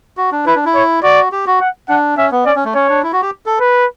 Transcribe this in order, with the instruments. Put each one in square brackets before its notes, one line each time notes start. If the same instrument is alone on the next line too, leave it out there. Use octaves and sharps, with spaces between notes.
[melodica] F#4
D4
[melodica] E4 [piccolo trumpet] B4
[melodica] D4
E4
[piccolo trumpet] C#5
[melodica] F#4 [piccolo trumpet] D5
[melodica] G4
F#4
[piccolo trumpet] F#5
[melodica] D4 [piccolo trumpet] F#5
[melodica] C#4 [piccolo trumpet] E5
[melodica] B3
[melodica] C#4 [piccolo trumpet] D5
[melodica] C#4
A3
[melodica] C#4 [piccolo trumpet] C#5
[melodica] D4
E4
F#4
G4
A4
[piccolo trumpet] B4